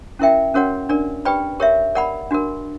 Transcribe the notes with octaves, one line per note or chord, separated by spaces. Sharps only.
C#4 E4 A#4 E5 G5
C#4 F#4 A#4 C#5 F#5
D4 A#4 D5
G4 B4 D5 G5 B5
G4 A#4 C#5 E5
A#4 D5 F#5 B5
D4 F#4 A#4